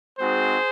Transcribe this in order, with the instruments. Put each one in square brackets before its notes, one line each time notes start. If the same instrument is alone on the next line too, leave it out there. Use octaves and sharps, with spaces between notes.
[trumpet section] G#3 C4 D#4 F#4 G#4 C5